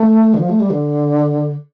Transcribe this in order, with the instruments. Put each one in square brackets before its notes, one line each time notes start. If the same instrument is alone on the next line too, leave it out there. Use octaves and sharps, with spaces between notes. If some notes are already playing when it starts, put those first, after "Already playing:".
Already playing: [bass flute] A3
D3
F3
A3
G3
D3